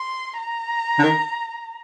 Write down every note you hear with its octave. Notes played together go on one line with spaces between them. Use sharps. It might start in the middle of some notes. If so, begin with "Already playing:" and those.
Already playing: C6
A#5
D3
D#3